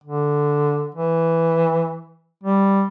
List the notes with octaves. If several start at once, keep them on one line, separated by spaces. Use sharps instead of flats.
D3
E3
G3